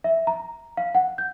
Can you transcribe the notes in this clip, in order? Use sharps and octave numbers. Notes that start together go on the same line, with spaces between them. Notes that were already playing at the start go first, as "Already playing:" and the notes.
E5
A#5
F5
F#5
G6